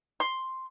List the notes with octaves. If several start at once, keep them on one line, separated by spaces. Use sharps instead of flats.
C6